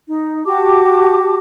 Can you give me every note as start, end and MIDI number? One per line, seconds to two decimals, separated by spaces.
0.07 0.45 63
0.46 1.37 66
0.46 1.37 67
0.46 1.37 81
0.46 1.37 86